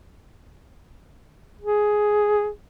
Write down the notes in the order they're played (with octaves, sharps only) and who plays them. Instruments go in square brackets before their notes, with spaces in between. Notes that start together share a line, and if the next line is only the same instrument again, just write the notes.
[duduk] G#4